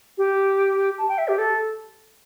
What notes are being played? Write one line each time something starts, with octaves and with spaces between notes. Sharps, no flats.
G4
A5
G5
E5
G4
A4